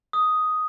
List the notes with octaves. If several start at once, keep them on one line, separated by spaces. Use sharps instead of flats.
D#6